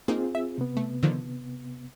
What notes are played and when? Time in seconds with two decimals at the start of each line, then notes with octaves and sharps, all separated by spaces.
0.08 A#3 C4 D#4 F4 G#4
0.35 E5
0.58 C3 B3
0.77 A3
1.03 D3 D#3 F3